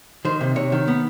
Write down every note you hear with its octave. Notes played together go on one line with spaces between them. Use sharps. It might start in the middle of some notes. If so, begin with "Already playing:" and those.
D#3 C5
C3
C3 C#5
D#3
B3